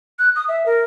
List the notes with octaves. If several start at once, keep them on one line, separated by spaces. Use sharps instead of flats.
F#6
D#6
E5
A#4